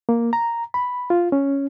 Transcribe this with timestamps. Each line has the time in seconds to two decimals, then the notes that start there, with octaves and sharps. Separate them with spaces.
0.09 A#3
0.33 A#5
0.74 B5
1.10 F4
1.32 C#4